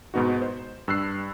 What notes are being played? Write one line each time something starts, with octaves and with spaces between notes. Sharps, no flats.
G#2 B2 B3 D#4 F#4
C5
G2 E6 F#6 C7